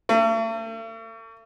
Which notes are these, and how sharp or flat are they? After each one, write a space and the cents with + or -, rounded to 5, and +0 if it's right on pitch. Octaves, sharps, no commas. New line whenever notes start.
A3 +45